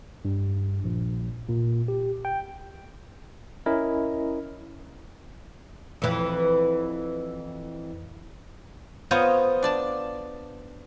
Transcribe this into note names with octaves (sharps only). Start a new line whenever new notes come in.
G2
A#1
A#2
G4
G5
C#4 E4 A#4 D#5
F2 E3
B3 F4 C5 C#5 D#5 A#5
D4 D5 A5